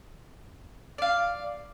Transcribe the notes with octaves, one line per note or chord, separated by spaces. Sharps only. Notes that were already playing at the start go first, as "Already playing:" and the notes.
D5 F5